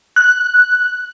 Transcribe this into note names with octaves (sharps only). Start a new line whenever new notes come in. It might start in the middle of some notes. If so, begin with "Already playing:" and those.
F#6